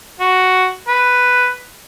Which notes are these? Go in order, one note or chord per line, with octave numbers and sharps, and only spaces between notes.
F#4
B4